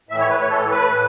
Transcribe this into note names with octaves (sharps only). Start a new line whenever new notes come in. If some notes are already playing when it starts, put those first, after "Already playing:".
A2 E3 E5
C#5
B4
C#5
A2 E3 A4
B4
A2